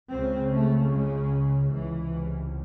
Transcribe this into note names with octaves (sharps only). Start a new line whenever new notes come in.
C#2 C#3 C4
A3
G#3
C#2 C3 E3